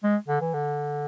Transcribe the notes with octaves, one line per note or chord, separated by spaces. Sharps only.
G#3
D3
E3
D3